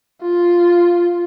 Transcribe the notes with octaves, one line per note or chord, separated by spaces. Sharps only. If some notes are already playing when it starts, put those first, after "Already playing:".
F4